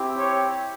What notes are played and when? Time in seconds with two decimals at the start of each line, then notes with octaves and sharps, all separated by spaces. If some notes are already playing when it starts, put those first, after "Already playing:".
Already playing: C4 E4 G4
0.16 C#5